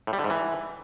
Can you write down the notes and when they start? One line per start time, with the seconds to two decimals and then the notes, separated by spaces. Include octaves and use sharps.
0.07 A2
0.13 G3
0.19 D3
0.24 G#2
0.30 E3